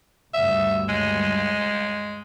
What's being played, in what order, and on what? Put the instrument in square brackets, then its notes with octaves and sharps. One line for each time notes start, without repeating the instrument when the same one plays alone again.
[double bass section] D2 G2 C#3 [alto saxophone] E5
[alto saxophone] G#3